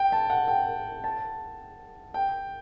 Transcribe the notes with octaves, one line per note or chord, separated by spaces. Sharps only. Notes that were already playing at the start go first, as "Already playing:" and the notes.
Already playing: G5
A5
F#5
G5
A5
G5